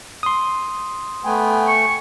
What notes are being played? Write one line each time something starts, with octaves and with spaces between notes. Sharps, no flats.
C6 D#6
A3 B3 G5 G#5
C#6